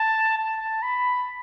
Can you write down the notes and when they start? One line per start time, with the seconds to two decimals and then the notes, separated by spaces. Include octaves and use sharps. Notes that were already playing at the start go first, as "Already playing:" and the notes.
Already playing: A5
0.38 A5
0.82 B5